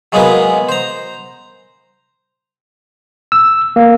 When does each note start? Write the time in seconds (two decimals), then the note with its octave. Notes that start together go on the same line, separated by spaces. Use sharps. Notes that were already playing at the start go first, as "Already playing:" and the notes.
0.12 F#3 G#3 A#3 B3 G#4 B4
0.69 C5 A#5
3.32 E6
3.76 A#3